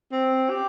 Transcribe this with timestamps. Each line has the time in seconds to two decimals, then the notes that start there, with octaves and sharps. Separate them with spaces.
0.12 C4
0.50 G4